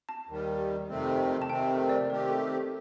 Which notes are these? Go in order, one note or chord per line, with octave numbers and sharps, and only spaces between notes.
A5
D#2 D#3 G3
F2 C3 D#3 A3 C4
A5
F2 C3 D#3 A3 C4 G5
D5
D#3 A3 C4 G4 A#4
A4